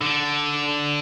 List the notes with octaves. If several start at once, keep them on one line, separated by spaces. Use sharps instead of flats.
D3